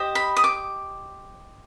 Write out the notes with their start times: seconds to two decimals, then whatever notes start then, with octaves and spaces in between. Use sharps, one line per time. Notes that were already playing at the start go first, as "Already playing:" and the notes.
Already playing: G4 C5 D#5
0.15 B5
0.37 D#6
0.44 D6